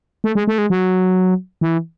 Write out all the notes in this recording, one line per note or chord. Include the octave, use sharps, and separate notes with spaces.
A3
G#3
A3
G#3
F#3
E3